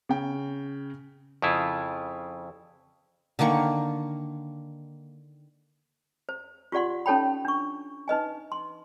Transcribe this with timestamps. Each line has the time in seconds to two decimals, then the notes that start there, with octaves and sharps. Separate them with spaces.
0.09 C#3 G5
1.42 F2 C#3 E4 F4
3.39 D3 D#3 A#3 C#6
6.29 C5
6.72 F4 G4 D5 F#5 C6
7.06 C#4 D#4 A4 C#5 G5 B5
7.45 D4 C#6
8.08 D#4 B4 D#5 G#5
8.52 C6